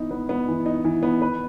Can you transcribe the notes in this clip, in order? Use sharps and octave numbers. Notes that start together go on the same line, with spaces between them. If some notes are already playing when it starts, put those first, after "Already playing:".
Already playing: E3 B3 D#4
B3
B3
E3
D#4
E3
B3
B4